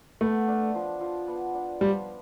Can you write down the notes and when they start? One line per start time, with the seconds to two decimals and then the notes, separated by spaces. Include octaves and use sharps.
0.21 A3 B3
0.48 D4
0.75 F3
1.01 F3
1.28 B3
1.54 D4
1.81 F3 G3